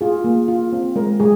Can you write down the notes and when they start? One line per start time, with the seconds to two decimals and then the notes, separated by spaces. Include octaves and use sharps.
0.01 F4 G#4
0.24 A#3
0.48 F4
0.73 C4
0.96 G#3 A#4
1.20 G#3 G#4